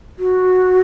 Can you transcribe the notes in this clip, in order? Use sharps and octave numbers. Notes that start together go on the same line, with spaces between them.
F#4